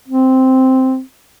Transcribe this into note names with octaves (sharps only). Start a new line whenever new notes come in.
C4